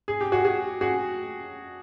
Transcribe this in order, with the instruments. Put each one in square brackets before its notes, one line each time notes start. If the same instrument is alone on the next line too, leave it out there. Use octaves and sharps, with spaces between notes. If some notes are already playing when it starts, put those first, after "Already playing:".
[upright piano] G#4
G4
F#4 G#4
F#4 G#4
F#4 G#4